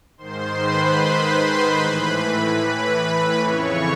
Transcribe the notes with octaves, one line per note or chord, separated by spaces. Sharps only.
G#2 D#3 C5 C6
B4 B5
A2 E3
B4 B5
F2 C#3 E3 C#5 C#6